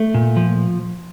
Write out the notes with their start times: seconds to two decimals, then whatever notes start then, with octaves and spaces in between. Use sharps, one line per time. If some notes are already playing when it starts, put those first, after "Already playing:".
Already playing: A3
0.14 A#2
0.37 F3